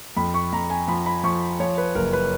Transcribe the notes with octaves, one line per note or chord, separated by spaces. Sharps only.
F2 B5
C#6
F2 A#5
G#5
F3 B5
B5
F3 C#6
F3 C#5
B4
F#1 A#4
B4